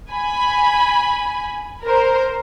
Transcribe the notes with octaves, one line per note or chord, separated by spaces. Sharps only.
G#5 B5
A#4 C5